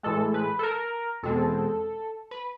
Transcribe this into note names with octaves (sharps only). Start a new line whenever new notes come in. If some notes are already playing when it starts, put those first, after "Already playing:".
A2 E3 G#3 A4
B4
A4
A#4
E2 B2 G#3 C4 A4
B4